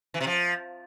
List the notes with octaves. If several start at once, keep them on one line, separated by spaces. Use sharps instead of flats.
E3
C3
F3